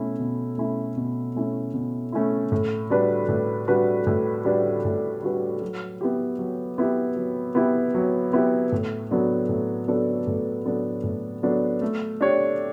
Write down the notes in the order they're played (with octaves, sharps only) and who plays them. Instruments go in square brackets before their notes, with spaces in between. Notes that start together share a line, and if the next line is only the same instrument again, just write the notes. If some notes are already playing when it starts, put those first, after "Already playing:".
Already playing: [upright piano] B2 A3 C#4 E4
B2
A3 C#4 E4
B2
A3 C#4 E4
B2
A3 C#4 E4
A2
G3 D4 F#4 B4
A2
G3 D4 F#4 B4
A2
G3 D4 F#4 B4
A2
G3 D4 F#4 B4
F#3
B3 E4 G4
F#3
B3 E4 G4
F#3
B3 E4 G4
F#3
B3 E4 G4
A2
F#3 B3 D4 A4
A2
F#3 B3 D4 A4
A2
F#3 B3 D4 A4
A2
F#3 B3 D4 A4
A3
D4 G4 C#5